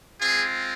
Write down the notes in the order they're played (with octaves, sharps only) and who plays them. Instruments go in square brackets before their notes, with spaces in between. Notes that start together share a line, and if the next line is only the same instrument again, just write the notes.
[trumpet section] G#3 C4 F4 G#4